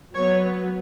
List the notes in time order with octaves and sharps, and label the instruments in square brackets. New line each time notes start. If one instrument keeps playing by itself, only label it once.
[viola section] F#3 B3 C#5